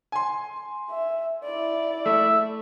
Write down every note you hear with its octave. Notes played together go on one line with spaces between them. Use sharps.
G#5 C6
E5
E4 D5
A3 E5